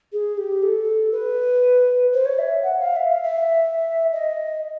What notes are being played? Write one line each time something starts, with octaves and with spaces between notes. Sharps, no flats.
G#4
G4
A4
B4
C5
C#5
E5
F#5
F5
E5
F5
E5
D#5